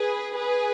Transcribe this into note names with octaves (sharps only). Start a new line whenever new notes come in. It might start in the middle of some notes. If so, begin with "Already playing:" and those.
Already playing: G#4 B4
G#4 B4